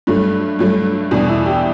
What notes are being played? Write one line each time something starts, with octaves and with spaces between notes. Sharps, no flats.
G2 F#3 A3
G2 F#3 A3
E2 B2 G3 D4
E4
G4